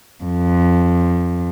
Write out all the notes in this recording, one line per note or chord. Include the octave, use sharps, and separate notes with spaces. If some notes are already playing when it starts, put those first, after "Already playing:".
F2